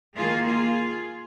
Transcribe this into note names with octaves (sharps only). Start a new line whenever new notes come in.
D#3 A#3 F4 G#4
F4 G#4